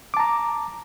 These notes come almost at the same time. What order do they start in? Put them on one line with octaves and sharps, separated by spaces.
D6 A5 A#5